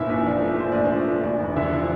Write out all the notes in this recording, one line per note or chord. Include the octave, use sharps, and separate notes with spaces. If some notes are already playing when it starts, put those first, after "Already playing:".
Already playing: F1 A#2 E4 E5
A#1
F3 D5
A3
A#2 C5
A#1 D5
C5
F3
A3
D2 D5
E1
D3 E4 E5
F3